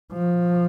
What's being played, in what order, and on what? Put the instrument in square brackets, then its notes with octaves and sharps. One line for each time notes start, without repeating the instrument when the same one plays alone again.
[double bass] F3